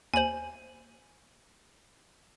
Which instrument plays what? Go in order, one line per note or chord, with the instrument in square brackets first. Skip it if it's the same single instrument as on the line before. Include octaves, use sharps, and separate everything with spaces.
[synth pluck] D#2 C5 [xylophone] G#5 F#7